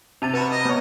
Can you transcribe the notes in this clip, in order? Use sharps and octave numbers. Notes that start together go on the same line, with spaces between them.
C3 A5 A6 D#7 F7
F#4 B4 B5
D#5
B3 C#5 G6